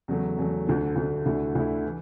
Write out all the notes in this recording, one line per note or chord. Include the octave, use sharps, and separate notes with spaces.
E2 C#3 F#3 A3
E2 C#3 F#3 A3
D2 D3 A3
D2 D3 A3
D2 D3 A3 E4
D2 D3 A3 E4
E3